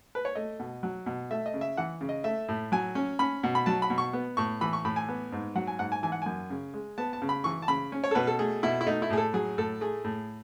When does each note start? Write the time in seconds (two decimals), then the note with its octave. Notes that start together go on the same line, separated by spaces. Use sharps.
0.15 B4
0.25 C#5
0.35 A3 D#5
0.60 B2
0.83 F#3
1.06 B2
1.31 A3 E5
1.46 D#5
1.54 C#3
1.61 E5
1.77 E3 F#5
2.01 C#3
2.09 D#5
2.24 A3 E5
2.48 A2
2.72 F#3 G#5
2.95 C#4
3.19 C#4 B5
3.44 B2
3.55 B5
3.66 F#3 A5
3.82 B5
3.90 B2
3.98 C#6
4.13 B3
4.37 A2 C#6
4.61 E3 B5
4.73 C#6
4.85 A2 B5
4.96 G#5
5.08 B3
5.32 G#2
5.56 F#3 F#5
5.67 G#5
5.79 G#2 F#5
5.92 G#5
6.03 E3 G#5
6.12 F#5
6.22 F#2 G#5
6.50 C#3
6.74 G#3
6.98 B3 A5
7.13 A5
7.22 C#3
7.29 B5
7.44 E3 C#6
7.62 A5
7.68 C#3 B5
7.92 C#4
8.04 C#5
8.11 A4
8.15 B2 B4
8.27 A4
8.39 A3 G#4
8.63 B2 E4
8.81 E4
8.87 A3 D#4
9.02 E4
9.10 A2 G#4
9.17 A4
9.34 F#3 G#4
9.58 A2 A4
9.81 A3 G#4
10.04 A2